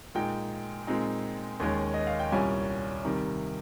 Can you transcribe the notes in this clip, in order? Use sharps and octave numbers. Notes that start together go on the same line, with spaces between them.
A#2 G#3 D#4 G5
A#2 G#3 C4 D#4
D#2 D#3 G#3 C#4
D#5
F5
G5
C2 A#2 G3 C#4 G#5
C3 D#3 G3